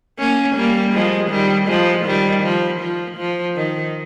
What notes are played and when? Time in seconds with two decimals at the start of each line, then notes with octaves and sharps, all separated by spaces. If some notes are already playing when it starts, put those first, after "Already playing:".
0.19 A#3 C#4
0.56 G3 A#3
0.94 F3 G#3
1.31 D#3 G3
1.68 F3 G#3
2.06 D#3 G3
2.44 F3
2.81 F3
3.17 F3
3.56 D#3